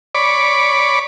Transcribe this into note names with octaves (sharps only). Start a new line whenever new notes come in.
C#5 D5 B5 D6